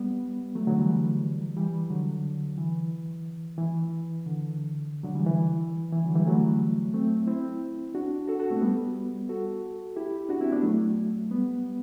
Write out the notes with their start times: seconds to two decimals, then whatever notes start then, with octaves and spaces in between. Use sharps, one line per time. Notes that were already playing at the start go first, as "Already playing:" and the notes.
Already playing: G3 B3
0.55 F#3 A3
0.67 D3 F#3
0.78 E3 G3
1.57 E3 G3
1.90 D3 F#3
2.58 E3
3.58 E3
4.26 D3
5.03 D3 F#3
5.15 E3 G3
5.27 E3
5.93 E3
6.04 D3 F#3
6.15 E3 G3
6.26 F#3 A3
6.94 A3 C4
7.27 C4 E4
7.95 D4 F#4
8.28 F#4 A4
8.39 F#4 A4
8.51 A3 C4
8.61 G3 B3
9.29 F#4 A4
9.96 E4 G4
10.29 D4 F#4
10.41 C4 E4
10.52 B3 D4
10.63 F#3 A3
11.31 G3 B3